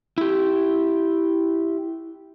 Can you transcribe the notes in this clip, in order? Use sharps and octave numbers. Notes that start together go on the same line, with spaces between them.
E4 G4